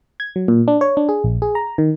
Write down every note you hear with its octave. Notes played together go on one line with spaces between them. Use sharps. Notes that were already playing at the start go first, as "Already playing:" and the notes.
G#6
F#3
A#2
D4
C#5
D4
G#4
A#1
G#4
A#5
D#3